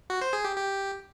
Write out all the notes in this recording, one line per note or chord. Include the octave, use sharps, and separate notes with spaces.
F#4
C5
G#4
G4
G4